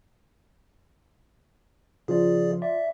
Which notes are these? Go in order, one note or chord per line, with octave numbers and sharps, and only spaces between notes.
C#3 F3 F4 G#4 D5
D5 E5